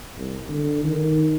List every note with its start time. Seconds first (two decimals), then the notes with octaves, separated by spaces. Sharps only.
0.16 C2
0.49 D3
0.84 D#3